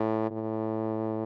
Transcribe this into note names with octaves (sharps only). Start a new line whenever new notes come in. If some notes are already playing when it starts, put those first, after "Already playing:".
Already playing: A2
A2